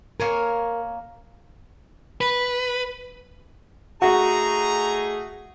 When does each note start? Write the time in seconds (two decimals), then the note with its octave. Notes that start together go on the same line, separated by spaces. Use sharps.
0.20 A#3 A#4 C#5 G#5
2.21 B4
4.02 A3 D#4 F#4 G#4 A#5